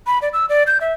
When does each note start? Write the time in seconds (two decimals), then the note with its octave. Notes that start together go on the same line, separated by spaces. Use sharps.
0.07 B5
0.22 D5
0.33 E6
0.49 D5
0.67 G6
0.81 E5